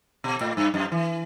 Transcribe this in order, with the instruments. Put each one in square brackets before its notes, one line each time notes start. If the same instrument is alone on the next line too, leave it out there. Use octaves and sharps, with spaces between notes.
[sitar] B2
A2
G2
F#2
E3